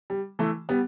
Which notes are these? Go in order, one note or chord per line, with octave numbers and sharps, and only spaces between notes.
G3
E3 A3
G3 B3